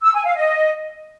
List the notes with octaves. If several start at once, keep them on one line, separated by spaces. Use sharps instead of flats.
E6
G#5
F5
D#5